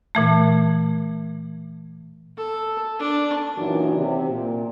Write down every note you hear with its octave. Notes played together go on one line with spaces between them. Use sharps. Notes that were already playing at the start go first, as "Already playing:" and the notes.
A#2 E3 A3
A4
D4
F#2 A#2 D#3 E3 F#3 D4
C3
A#2